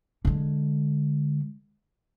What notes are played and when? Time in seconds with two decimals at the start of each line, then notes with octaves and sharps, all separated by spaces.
0.25 D3 G#3